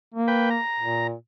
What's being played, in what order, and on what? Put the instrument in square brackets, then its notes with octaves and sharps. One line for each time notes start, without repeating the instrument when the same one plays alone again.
[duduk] A#3
[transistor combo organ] B4 G5
A#5
[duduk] A#2